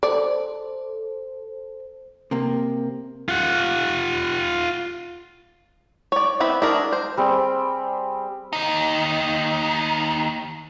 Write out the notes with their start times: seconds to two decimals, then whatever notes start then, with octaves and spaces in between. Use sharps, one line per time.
0.03 A4 C5 D5
2.31 C3 A#3
3.29 F4 F#5
6.12 C#5 D5
6.40 B3 C4 E4 B5
6.62 D4 E4 F#4 G#4 A#4
6.92 C5
7.17 G3 C4 G#4 G5
8.53 D#2 D#4